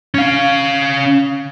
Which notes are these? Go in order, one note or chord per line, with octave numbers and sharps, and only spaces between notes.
C#4 F5